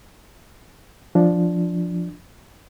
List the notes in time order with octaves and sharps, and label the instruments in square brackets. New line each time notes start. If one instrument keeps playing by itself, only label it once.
[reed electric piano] F3 D4